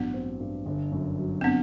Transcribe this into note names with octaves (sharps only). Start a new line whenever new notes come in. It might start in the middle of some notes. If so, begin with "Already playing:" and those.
Already playing: A1 G2 F#3 B3 D4
C4
G2
G1
F#2
F#3
C4
B3 D4